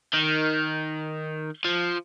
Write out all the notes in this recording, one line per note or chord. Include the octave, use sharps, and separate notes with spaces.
D#3
F3